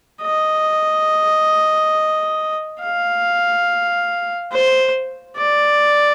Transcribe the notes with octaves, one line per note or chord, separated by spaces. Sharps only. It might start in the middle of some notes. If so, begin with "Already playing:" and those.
D#5
F5
C5
D5